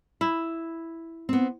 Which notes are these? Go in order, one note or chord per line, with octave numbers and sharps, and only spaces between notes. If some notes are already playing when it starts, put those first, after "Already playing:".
E4
B3 C4